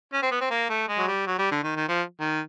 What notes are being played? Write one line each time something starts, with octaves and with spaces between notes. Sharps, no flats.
C#4
C4
B3
C4
A#3
A3
G#3
F#3
G3
F#3
G3
D3
D#3
D#3
F3
D#3